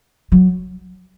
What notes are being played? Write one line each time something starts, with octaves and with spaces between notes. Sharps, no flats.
F#3